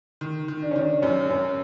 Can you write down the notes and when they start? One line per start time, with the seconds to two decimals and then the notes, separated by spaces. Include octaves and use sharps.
0.21 D#3
0.48 D#3
0.62 D4
0.71 D#3 C#4
0.81 D4
1.02 F#2 C#4
1.29 F#2 C#4